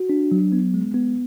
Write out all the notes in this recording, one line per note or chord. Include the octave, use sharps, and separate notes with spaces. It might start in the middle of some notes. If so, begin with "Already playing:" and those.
Already playing: F#4
D4
F#3
B3
G#3
B3